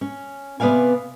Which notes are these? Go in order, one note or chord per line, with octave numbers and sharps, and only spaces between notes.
C#4
C3 B3 B4 D5 F5 G#5